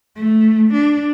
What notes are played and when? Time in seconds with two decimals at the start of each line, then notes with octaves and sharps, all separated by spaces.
0.16 A3
0.74 D4